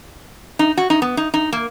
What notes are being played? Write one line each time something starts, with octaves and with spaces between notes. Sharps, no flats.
D#4
F#4
D#4
B3
D#4
D#4
A#3